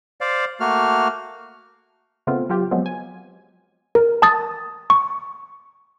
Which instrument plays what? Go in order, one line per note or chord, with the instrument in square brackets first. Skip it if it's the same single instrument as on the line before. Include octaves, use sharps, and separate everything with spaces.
[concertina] C5 D5 F5
A3 A#3 F#4 F6
[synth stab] C#3 A3 B3 C4 F4
F#3 F4 G4
F3 F#3 G#3 B3 C4
G#5
[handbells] A#4
A5 D#6 A6
C#6